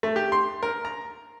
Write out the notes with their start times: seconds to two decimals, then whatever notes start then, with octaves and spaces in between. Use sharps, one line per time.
0.03 A3
0.16 G4
0.32 C6
0.63 A#4
0.85 A#5